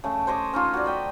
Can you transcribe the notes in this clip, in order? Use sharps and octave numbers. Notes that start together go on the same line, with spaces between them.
C#3 A3
C5 C#5 D#5 D6
C#4 D#4 F4
F#4 D5
D#5 G5 B5